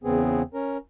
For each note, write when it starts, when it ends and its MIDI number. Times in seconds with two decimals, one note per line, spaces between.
0.04 0.42 40
0.04 0.42 49
0.04 0.42 59
0.04 0.42 60
0.04 0.42 68
0.54 0.77 61
0.54 0.77 70